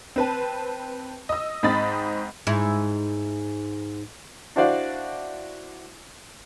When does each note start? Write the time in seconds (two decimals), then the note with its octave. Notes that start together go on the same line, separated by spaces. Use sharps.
0.16 C4 B4 A5
1.29 D#5 E6
1.63 G#2 C4 D#5 B5 A6
2.47 G#2 E4
4.56 D4 E4 F#4 C5 D5 F5